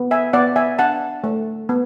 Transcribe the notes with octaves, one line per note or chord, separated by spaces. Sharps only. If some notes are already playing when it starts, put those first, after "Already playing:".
Already playing: B3
E5 G#5
B3 D5 F#5
E5 G#5
D4 F#5 A5
A3
B3